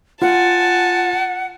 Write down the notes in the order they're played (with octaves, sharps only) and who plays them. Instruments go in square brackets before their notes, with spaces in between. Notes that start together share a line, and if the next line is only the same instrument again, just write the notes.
[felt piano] F4 [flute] F#5 [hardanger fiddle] G#5 A5